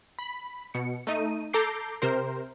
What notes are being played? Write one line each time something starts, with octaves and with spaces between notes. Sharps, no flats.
B5
B2 C#7
A3 D#4 D#7
A4 A#5 D6 G6 C7
C3 A#4 C5